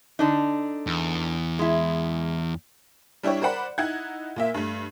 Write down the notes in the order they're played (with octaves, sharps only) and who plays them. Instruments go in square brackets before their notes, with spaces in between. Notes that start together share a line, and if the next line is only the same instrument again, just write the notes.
[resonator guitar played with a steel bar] D3 D4 D#4
[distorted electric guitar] E2
[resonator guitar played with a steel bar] G#3 E4
[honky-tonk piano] G3 D4 E4 G4 C#5
A#4 C5 D5 F#5 B5
D#4 E4 F#5 F#6 G#6
A#2 A#3 E5
G2 A3